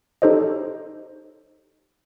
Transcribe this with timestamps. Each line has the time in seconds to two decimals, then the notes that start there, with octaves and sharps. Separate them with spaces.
0.22 D#4 G4 A4 C5 C#5 D#5